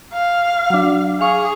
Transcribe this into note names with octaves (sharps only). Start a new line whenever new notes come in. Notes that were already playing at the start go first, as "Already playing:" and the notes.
F5
F#3 D4
G#4 F5 C#6